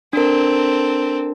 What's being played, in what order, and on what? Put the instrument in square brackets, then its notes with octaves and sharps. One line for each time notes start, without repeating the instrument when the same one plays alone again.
[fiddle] C4 A4 [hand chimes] D4 A#4